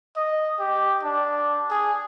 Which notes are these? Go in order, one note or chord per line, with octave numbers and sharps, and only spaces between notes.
D#5
G4
D4
G#4